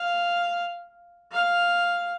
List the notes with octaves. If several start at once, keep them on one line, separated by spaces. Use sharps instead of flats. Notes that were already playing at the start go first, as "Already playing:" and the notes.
Already playing: F5
F5